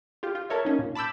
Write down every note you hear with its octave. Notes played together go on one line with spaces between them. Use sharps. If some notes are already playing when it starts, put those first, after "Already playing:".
F4 G4
F4
A4 A#4 C#5 E5
A#3 C#4 D#4
A#2
A5 B5 D6 E6 G6